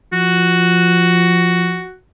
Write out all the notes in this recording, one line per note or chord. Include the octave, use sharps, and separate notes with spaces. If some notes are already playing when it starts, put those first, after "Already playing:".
F3 F#4